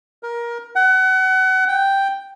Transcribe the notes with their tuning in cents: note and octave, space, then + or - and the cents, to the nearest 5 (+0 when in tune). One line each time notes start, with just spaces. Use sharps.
A#4 +20
F#5 +30
G5 +0